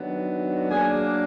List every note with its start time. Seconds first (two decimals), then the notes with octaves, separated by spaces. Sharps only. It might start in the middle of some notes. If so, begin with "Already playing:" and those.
Already playing: D#3 F#3 B3 D4
0.69 F#3 A#3 D4 G#4 G#5